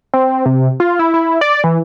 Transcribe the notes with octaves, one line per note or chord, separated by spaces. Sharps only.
C4
C3
F4
E4
E4
D5
E3